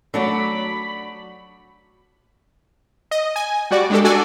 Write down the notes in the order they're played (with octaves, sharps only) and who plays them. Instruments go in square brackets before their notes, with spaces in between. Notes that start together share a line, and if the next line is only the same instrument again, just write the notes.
[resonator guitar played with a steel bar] F#3 D4 F#4 [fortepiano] A3 [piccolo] B5
[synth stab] D#5
G#5
G3 F#4 D5
G#3 D4 G4 A4
D4 F#4 A4 D5 G#5